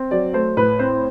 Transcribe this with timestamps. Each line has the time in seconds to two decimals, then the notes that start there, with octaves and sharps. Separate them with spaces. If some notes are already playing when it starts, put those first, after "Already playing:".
Already playing: C4
0.11 F#3 D5
0.33 A3 C5
0.57 A2 B4
0.79 C4 C5